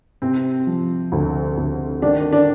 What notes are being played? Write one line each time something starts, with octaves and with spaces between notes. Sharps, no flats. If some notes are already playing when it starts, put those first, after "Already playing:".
C3 C4
F3
D2
D2
D#3 D4
D4